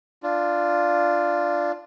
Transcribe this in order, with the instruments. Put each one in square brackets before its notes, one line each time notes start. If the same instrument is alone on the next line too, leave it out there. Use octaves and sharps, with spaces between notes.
[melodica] D4 F4